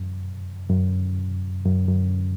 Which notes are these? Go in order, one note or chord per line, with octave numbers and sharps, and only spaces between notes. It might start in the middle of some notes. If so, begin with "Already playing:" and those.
Already playing: F#2
F#2
F#2
F#2